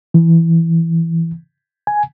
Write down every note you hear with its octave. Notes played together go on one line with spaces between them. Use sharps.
E3
G#5